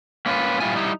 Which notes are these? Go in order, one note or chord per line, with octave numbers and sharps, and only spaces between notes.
A#3 C#4 E4 F4 B4
A#2 G3 E4 F4 G#5
G3 D#4 E4